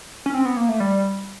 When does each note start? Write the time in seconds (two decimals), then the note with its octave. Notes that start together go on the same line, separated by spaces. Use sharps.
0.26 C#4
0.34 C4
0.45 B3
0.57 A#3
0.69 A3
0.80 G3